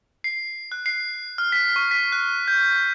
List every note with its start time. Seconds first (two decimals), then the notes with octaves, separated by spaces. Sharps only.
0.24 C7
0.72 F#6
0.86 C7
1.38 F6
1.52 B6
1.76 C#6
1.91 B6
2.12 F#6
2.48 G6